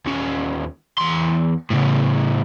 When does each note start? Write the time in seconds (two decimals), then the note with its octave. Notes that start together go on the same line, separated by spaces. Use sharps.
0.06 D#2 C#4
0.98 E2 C6
1.70 A2 C#3